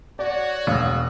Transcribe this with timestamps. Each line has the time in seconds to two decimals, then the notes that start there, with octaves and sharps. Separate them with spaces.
0.19 F#4 C#5 D5
0.67 E1 F3 A3 A#3 F5 D#6 F#6